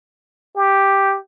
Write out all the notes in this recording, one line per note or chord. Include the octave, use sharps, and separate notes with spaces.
G4